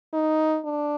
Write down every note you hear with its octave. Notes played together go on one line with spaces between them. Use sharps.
D#4
D4